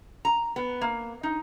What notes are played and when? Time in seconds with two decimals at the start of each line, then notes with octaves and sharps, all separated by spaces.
0.25 A#5
0.56 B3
0.81 A#3
1.23 D#4